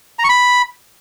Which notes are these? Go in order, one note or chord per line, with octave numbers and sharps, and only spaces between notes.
A#5
C#6
B5